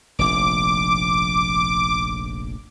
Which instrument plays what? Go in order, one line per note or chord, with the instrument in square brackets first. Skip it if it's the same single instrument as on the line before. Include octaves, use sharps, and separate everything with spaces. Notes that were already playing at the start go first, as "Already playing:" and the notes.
[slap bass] F1 A#1 [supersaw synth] D6